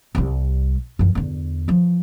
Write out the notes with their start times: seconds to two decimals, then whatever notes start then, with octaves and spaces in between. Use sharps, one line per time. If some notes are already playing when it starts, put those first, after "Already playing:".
0.15 C2 G3
0.99 F#2 E3
1.15 E2 D3
1.68 E3 F3